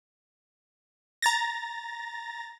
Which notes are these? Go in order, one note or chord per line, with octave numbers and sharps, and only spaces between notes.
A#5 A6 A#6